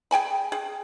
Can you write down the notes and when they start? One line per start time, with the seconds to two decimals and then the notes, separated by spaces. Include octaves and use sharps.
0.11 G#4 G5 G#5 B5
0.52 G#4